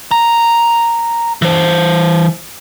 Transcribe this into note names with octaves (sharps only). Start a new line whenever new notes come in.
A#5
E3 C5